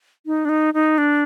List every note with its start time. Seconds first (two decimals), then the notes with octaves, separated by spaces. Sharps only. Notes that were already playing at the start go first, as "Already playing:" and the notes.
0.26 D#4
0.45 D4
0.49 D#4
0.74 D#4
0.98 D4